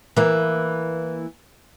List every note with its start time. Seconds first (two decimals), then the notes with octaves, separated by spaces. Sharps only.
0.17 E3 A#3